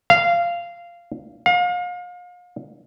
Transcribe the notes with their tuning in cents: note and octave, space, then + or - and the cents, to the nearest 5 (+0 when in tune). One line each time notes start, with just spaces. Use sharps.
F5 -15
F5 +35